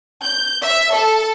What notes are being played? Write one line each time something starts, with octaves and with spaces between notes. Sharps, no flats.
G6
E5
A4